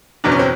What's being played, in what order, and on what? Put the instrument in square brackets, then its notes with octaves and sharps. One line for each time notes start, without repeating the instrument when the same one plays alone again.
[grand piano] F#1 E2 B2 F#3 D4
C#4
C4